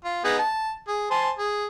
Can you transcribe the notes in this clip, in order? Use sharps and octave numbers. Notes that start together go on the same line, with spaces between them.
F4
B3 D#4 G#4
A5
G#4
C5 G#5 A5
G#4